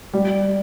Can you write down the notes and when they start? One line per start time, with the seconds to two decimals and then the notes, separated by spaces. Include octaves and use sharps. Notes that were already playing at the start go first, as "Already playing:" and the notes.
0.13 G3